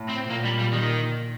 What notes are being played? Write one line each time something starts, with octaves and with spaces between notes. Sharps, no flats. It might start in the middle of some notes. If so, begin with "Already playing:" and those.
Already playing: A2
C4
A#2 A#3
G3
G3
D#3